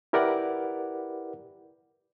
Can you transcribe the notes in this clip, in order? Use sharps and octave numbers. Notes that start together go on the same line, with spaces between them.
E4 G4 A#4 B4 D5 F#5